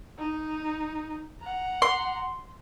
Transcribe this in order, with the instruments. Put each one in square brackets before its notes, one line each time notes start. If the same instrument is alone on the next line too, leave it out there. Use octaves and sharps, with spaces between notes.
[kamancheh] D#4
F#5 A#5
[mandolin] C6